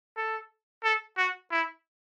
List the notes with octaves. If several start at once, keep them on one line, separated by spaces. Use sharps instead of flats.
A4
A4
F#4
E4